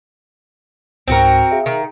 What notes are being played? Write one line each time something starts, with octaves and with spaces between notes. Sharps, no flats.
C#2 G#2 C4 F#4 A#4
G#4 E5 F5
D#3